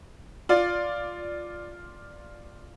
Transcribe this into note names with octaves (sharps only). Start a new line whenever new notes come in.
F4 D5